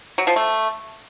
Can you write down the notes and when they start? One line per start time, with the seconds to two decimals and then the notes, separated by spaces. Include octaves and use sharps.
0.18 F#3
0.27 F3
0.36 A3